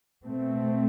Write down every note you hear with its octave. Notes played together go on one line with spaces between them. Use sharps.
B2 A3 C4